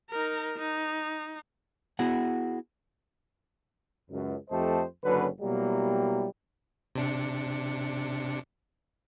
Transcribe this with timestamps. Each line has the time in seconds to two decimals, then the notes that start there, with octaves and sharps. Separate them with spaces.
0.11 D#4 A#4
0.58 D#4
1.99 B3 E4 F#4 G#4 F#5
4.10 C#2 F#2
4.50 F2 A3 G4 C5 D#5 A5
5.03 F#1 D3 F#3 C#4 B4
5.40 B2 F#3 G3 A#3 E4 G4
6.96 C3 D4 C#7